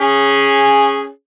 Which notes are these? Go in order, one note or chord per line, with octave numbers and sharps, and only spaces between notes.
C#4 G#4